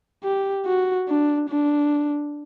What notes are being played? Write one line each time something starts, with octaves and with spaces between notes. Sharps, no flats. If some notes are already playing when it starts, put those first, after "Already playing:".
G4
F#4
D4
D4